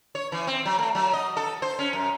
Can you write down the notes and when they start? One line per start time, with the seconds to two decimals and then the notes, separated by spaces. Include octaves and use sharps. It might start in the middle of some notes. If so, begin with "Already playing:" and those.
0.15 C#5
0.32 E3
0.47 C4
0.65 F#3
0.79 A3
0.95 F#3
1.13 D#5
1.37 A4
1.62 C5
1.79 C#4
1.93 F#2